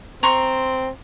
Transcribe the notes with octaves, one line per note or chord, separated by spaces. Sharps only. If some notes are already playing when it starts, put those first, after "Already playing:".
C4 A#5 C6 C#6